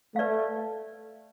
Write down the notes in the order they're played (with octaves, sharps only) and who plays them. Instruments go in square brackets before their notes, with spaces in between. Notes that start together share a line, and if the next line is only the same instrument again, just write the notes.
[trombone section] A3 [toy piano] B4 D5 F5